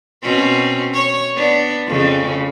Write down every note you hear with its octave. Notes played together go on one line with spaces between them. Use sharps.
B2 C4 C#4
C#5
B3 D4
F2 C#3